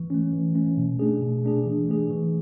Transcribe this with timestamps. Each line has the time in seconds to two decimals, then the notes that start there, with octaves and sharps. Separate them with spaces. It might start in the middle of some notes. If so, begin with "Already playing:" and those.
Already playing: E3
0.10 A3 C#4
0.33 E3
0.55 A3 C#4
0.77 B2
0.99 A3 D4 G#4
1.22 B2
1.44 A3 D4 G#4
1.66 E3
1.89 A3 D4 G#4
2.10 E3